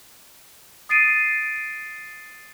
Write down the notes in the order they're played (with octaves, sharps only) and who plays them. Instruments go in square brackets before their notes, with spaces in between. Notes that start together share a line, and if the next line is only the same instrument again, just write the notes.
[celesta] D#6 A6 C7 D7 D#7